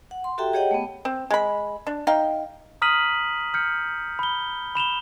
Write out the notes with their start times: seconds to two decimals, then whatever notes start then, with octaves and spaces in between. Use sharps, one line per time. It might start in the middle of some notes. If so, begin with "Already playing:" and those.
0.11 F#5
0.24 C6
0.38 F#4 G4 A4 E5 G5 A#5
0.53 G4 G#4 C#5 D#5 F#5 G5
0.71 A3 B3
1.05 C4
1.30 G#3 B5
1.87 D4
2.07 D#4 F5 G5
2.82 A#5 D#6 F6 B6 D#7 F#7
3.54 F6 G6 C#7
4.19 B5 G7
4.75 B5 E7 F7 G7